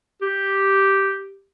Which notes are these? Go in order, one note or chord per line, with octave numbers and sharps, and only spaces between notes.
G4